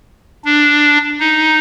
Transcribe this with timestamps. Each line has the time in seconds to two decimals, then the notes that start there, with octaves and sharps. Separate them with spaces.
0.45 D4
1.20 D#4